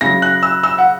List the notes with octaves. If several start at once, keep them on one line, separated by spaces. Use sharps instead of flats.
C#3 F#3 A#6
F#6
E6
E6
F#5